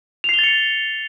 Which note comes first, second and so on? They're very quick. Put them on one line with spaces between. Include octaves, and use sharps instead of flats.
F7 C7 G7 A6 C#7